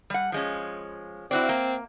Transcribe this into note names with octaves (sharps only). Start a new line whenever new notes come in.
G3 F#5
F3 G#3 C#4
C4 E4 F#4 D5
A#3